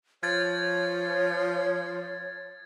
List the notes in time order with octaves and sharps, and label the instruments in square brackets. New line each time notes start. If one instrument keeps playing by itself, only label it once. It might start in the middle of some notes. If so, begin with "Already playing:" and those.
[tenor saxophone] F3 [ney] C#5 [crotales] G#6 A6